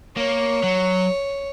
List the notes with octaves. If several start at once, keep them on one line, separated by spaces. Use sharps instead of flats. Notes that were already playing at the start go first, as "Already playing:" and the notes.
A#3 C#5
F#3